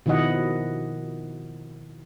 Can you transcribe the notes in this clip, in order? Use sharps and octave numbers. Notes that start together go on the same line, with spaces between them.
B2 D#3 F3 E4 D#5 F#5